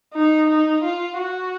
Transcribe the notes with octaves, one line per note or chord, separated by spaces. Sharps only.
D#4
D#4
F4
F#4